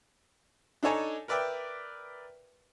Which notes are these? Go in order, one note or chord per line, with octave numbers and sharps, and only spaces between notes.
D4 D#4 A4 C#5 G#5 A#5
A#4 B4 D5 E5 G5